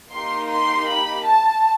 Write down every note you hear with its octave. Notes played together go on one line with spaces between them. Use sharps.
A#3 D#4 G4 C6
C6
B5
A5